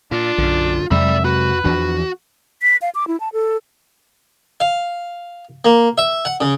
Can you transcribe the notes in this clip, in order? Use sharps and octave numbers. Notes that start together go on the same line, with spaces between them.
A#2 D4 F4
B1 F#2 D3
F2 C3 F#3 G#3 D5 E5 B5
F#4 B4
E2 E3 F3 D4 F#4
B6
F5
D6
E4
A5
A4
F5
A#3
E5
F#5
C#3